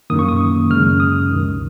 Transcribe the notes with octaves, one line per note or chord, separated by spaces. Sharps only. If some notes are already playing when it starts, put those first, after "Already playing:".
F#2 D#3 A#3 D#6
C#6
D#6
F#2 C#3 G#3 F6
D#6
C#2 C3 D#3